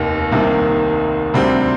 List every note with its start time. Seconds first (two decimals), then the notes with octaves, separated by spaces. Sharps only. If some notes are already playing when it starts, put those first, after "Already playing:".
Already playing: F1 D#2 D#3 A#3 D#4
0.32 C2 C3 D#3 A#3
1.34 D2 C3 G3 C4